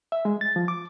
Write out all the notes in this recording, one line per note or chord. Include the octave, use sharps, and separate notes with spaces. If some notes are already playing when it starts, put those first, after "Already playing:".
E5
G#3
A6
F3
D6